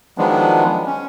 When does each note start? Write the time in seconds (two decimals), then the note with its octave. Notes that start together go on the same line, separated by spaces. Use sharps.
0.18 D#3 F3 F#3 G#3 B3 D4
0.86 C#4